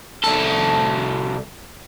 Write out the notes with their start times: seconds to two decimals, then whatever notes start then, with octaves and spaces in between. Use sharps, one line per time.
0.24 C2 A4